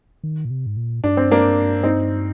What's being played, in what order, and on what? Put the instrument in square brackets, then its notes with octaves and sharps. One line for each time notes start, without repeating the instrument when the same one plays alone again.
[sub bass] D#3
A#2
C3
G#2
A#2
[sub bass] G2 [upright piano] D4
[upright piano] C4
A#3 D4
C4 D#4